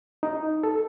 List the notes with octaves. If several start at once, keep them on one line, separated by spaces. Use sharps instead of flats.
D#4
A4